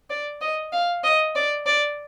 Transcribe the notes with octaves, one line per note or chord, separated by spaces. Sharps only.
D5
D#5
F5
D#5
D5
D5